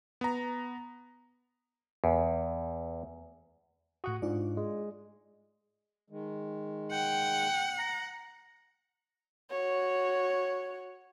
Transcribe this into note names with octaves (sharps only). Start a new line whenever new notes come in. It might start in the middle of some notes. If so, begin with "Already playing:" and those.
B3 A#5
E2
A2 F#4 F#5 D#6
G#2 D4 F4 D5
G#3
D#3 G#3
F#5 G5
A#5
F#4 C#5